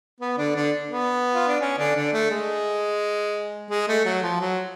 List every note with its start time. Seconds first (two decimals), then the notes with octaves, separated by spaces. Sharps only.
0.21 B3
0.38 D3 D4
0.56 D3 D4
0.91 B3
1.35 F4
1.48 D4
1.61 C#4
1.78 D3 D4
1.96 D3 D4
2.13 A3
2.31 G#3
3.70 G#3
3.88 A3
4.05 F#3
4.22 F3
4.40 F#3